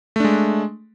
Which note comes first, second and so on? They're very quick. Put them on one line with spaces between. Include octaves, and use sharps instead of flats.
A3 D4 G#3